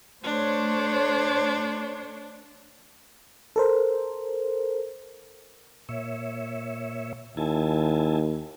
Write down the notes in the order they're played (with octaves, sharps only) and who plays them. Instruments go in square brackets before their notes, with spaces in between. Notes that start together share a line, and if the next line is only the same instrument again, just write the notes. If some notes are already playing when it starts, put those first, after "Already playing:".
[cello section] A3 C5 C#5 [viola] D4
[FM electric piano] A4 A#4 C5
[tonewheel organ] A#2 C#5 E5
[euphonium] D#2 [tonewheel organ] E4 G#5 A5